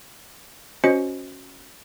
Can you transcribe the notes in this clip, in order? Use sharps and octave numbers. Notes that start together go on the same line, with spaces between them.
C#4 F#4 C5 D#5 C#7